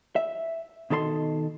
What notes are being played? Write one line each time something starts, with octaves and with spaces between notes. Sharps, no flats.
E5
B2 D#3 A4 C#5 C6